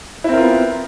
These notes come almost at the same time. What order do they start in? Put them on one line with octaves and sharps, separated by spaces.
E4 C4 A#4 F4 B3